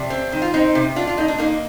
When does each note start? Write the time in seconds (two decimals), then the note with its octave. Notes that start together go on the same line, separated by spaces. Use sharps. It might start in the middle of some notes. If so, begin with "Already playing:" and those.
Already playing: C3 D4
0.10 C4
0.32 D#3
0.42 F4
0.54 C4 D#4
0.75 C3
0.96 D4 F4
1.07 F4
1.17 A#2 D#4
1.28 D4
1.38 A#3 D#4